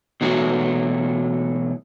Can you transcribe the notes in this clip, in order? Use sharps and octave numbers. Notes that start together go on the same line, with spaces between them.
B2 E3 F#3 A3